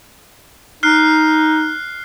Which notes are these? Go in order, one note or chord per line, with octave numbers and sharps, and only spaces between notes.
D#4 F6 F#6 C7